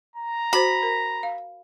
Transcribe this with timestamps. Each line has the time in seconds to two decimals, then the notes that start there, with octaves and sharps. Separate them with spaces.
0.16 A#5
0.53 F#4 C5 B5
0.83 A#4
1.23 F5